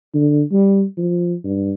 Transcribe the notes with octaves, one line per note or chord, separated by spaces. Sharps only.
D3
G3
F3
G2